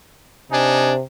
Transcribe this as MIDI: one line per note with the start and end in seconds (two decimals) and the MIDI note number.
0.52 1.01 48
0.52 0.93 62
0.52 0.93 63
0.52 0.93 80